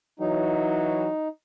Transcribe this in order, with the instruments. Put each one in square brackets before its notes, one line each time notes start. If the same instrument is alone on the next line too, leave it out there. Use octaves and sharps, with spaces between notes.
[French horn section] E3 F#3 [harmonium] D#4